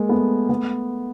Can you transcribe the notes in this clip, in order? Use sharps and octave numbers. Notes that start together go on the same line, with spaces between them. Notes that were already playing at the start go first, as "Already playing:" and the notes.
Already playing: G#3 A#3
A3 B3
A3 B3